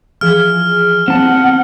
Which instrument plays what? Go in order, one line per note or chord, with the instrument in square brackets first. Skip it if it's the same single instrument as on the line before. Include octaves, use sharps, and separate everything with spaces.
[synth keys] E3 F3 G#4 [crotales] F6
[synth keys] F3 B3 [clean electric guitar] C4 A5 [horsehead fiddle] F#5